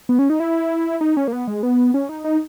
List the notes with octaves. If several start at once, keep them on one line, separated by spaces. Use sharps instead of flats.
B3
C#4
D#4
E4
D#4
C#4
A#3
B3
G#3
B3
C#4
D#4
D#4